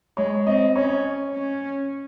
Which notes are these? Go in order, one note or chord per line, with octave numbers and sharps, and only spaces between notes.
G#3 C#5
C4 D#5
C#4 C#5
C#4